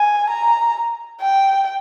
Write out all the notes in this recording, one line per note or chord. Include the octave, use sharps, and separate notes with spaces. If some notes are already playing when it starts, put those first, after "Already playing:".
Already playing: G#5
A#5
G5